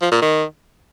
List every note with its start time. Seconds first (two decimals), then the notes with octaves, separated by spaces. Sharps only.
0.02 F3
0.12 A#2
0.22 D#3